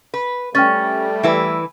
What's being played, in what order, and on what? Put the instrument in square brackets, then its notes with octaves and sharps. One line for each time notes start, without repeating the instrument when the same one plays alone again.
[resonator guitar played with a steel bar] B4
[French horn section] G3 A3 [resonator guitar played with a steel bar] C#4 [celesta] G5 F6 A6
[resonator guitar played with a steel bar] E3 E4 B4